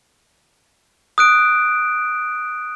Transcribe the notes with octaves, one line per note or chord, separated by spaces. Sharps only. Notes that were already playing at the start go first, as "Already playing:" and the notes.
D#6 F#6 D7